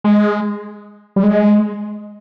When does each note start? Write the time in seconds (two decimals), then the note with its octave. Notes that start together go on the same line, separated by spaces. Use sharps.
0.04 G#3
1.16 G3
1.23 G#3